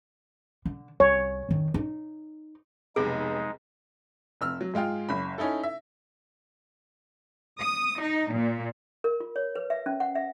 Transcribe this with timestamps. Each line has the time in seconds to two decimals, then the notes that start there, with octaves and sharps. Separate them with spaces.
0.65 D3
1.00 C2 C#5
1.49 F2 D#3
1.74 D#4
2.96 F1 B1 G#3 B3 D#4 G#4
4.41 F1 E6 F6
4.61 F#3
4.74 G#2 G#3 F4 G5 F6
5.09 F#1 B5
5.38 C#4 D#4 E4 A4
5.63 E5
7.60 D#6
8.02 D#4
8.33 A#2
9.04 A#4
9.20 F4
9.36 C#5
9.55 B4
9.70 E5
9.86 C#4
10.00 F#5
10.15 E5